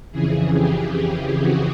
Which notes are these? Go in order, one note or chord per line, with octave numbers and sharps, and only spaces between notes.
F2 C#3 E3 G#4
G4
G4
F#4